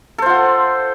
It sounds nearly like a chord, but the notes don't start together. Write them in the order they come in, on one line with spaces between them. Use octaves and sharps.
A4 C5 F4 F#5